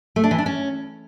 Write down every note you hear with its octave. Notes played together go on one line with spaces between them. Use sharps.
A3
D4
E3
D4
C#4